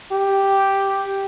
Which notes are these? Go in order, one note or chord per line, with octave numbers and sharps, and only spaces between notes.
G4